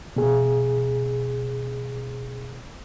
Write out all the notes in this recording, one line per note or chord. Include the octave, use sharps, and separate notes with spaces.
B2 G#4